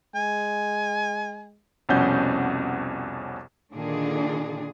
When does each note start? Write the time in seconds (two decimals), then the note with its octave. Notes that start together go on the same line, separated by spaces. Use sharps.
0.15 G#3 G#5
1.89 C2 F2 B2 C#4 F#5 G6
3.73 A#2 D3 D#3 D4 G#4